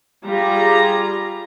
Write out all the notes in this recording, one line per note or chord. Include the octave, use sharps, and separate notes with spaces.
G3 F4 G#4 A#5